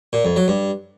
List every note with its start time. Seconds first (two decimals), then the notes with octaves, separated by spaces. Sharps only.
0.13 A#2
0.25 F2
0.36 F#3
0.48 G2